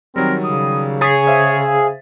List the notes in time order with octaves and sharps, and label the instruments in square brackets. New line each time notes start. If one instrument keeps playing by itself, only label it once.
[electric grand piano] D#3 F#3 G3 [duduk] C4 [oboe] A#4
[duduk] C#3 [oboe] D#6
[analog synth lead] G#4 [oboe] C#5 [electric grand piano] A6 B6
[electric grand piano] C5 E5 F5